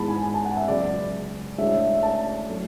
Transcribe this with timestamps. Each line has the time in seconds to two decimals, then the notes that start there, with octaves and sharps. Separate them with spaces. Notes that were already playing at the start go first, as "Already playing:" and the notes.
Already playing: G#2 E3 G#3 B3 E4 A5 B5
0.08 G#5
0.23 G#5
0.34 A5
0.45 F#5
0.57 E5
0.68 C#2 C#3 F#3 D5
1.58 A2 G#3 D4 E5
1.81 E5
2.03 A5
2.48 A2 F#3 A3 C#4